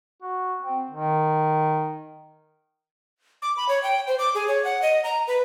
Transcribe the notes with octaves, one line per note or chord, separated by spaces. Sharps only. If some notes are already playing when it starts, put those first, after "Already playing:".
F#4
C4
D#3
D6
B5
C#5
G5
C5
D6
G#4
C#5
F#5
D#5
A#5
B4